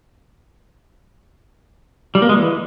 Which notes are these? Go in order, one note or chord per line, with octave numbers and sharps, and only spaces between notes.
G3
A#3
G#3
E3